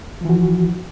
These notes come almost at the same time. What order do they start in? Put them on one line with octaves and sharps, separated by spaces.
F3 E3 F#4